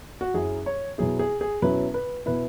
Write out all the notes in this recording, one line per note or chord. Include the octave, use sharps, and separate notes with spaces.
F#4
F#2 F#3 C#4 E4 G#4
C#5
B2 F#3 E4 G#4
G#4
G#4
B2 F#3 C#4 E4 B4
B4
B2 B3 E4 B4